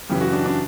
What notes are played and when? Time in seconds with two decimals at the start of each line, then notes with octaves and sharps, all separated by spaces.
0.10 F#2 C#3 E3 G4
0.21 F#4
0.33 D4
0.46 D4